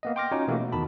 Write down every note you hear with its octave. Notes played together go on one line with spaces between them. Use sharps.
A#3 B3 D#5
G5 C6 D6 F6 A#6
C#4 D#4 F4 F#4 C#5
B2 E3 A3 A#3 F#4 G4
B2
E2 D#3 F#4 A5 B5